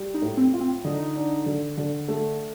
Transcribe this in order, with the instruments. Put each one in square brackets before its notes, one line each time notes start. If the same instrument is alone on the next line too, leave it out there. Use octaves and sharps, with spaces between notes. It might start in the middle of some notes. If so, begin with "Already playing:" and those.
Already playing: [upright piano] G3
[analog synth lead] D#4
[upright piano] A2
[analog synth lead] C4
[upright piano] F4
[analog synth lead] C4
[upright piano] D3 [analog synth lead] D#4
[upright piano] D4
D3
D3
A3